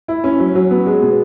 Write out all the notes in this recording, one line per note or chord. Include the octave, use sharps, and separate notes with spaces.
E4
C#4
F#3
F#3
B3
G#3
B2